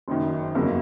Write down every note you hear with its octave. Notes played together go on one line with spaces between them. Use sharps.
F#1 F#2 D#3
G1 F2 C#3 F#3 A#3